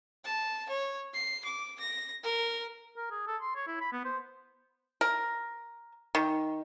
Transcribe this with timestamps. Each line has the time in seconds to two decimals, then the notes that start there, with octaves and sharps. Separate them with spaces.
0.25 A5
0.69 C#5
1.14 C7
1.45 D6
1.80 A#6
2.23 A#4
2.97 A#4
3.11 G#4
3.27 A4
3.42 C6
3.56 C#5
3.67 E4
3.81 B5
3.93 B3
4.05 C5
5.01 A#4
6.15 D#3